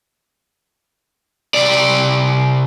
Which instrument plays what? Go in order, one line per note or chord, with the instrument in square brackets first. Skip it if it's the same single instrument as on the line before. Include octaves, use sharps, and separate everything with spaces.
[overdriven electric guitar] C3 D5